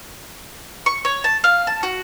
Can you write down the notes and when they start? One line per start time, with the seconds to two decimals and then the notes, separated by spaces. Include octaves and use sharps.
0.86 C#6
1.05 C#5
1.24 A5
1.44 F5
1.67 A5
1.83 F#4